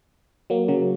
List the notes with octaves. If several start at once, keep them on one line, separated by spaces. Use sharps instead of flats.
F#3 A#3
C#3 F#3